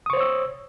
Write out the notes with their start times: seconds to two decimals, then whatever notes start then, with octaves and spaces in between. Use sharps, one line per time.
0.06 D#6
0.10 C#6
0.13 C5
0.17 C#5
0.21 E6